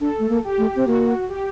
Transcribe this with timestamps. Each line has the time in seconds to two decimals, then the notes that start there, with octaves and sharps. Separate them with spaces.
0.01 D4 A4
0.19 A3
0.29 A#3
0.44 G4
0.58 A3
0.76 C4
0.86 A#3 F#4
1.29 G4